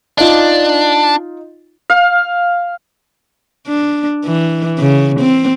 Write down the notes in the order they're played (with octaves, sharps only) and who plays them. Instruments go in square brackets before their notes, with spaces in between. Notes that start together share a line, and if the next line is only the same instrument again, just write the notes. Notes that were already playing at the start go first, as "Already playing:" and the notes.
[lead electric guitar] D4 [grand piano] D#4 F4
[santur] F5
[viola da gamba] D4
E3
C#3
C4